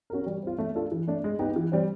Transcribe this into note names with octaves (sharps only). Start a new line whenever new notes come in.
C#4 F#4 A#4
G3
C4 F4
A3
D4 F4 A4
E3
A3 D4
G#3
B3 D#4 G4
E3
G3 C4